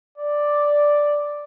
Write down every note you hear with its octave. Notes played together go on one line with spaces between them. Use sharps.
D5